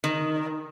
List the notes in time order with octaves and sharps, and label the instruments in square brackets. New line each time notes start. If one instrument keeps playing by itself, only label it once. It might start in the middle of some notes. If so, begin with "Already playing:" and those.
[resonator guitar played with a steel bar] D#3